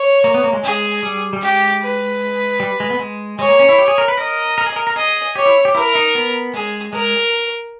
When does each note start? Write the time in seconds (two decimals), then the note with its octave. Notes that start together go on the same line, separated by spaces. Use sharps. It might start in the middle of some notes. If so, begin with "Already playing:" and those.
Already playing: C#5
0.24 A#3
0.34 B3
0.44 A#3
0.53 G#3
0.64 G#3 G#4
1.03 G3
1.33 G3
1.42 G#3 G4
1.82 B4
2.60 G3
2.80 G#3
2.90 B3
2.99 G#3
3.39 G#3 C#5
3.48 A#3
3.59 C#4
3.69 E4
3.79 G4
3.88 G#4
3.98 A#4
4.08 B4
4.17 A#4 D#5
4.58 A#4
4.66 G#4
4.76 A#4
4.87 A#4
4.96 G#4 D#5
5.36 G4 C#5
5.46 E4
5.65 G4
5.75 E4 A#4
5.95 D#4
6.15 B3
6.54 G#3 G#4
6.93 G#3 A#4